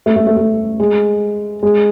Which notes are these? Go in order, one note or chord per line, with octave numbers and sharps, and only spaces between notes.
A3
A3
A3
A3
G#3
G#3